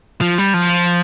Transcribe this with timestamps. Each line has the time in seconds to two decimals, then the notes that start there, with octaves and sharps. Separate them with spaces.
0.21 F3
0.38 G3
0.54 F3